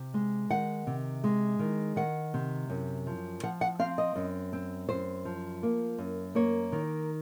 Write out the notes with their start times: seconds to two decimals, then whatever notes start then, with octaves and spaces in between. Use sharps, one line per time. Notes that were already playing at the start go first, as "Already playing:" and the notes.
Already playing: C3
0.14 G#3
0.50 D#3 F#5
0.87 C3
1.24 G#3
1.59 D#3
1.96 D#3 F#5
2.34 C3
2.70 F#2
3.07 F3
3.43 F3 F#5
3.61 F#5
3.79 C4 F5
3.98 D#5
4.16 F#2
4.53 C4
4.89 F#2 C5
5.25 F3
5.63 A#3
5.98 F#2
6.35 A#3 C#5
6.72 D#3